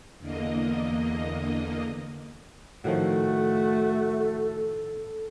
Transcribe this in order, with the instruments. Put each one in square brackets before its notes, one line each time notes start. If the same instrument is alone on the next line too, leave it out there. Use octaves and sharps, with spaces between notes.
[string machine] E2 D3 A#3 D#5
[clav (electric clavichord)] A2 D#3 F3 [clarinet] A3 [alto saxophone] F#4 [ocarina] A4